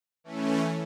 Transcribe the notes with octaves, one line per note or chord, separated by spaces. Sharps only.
E3 A3 C#4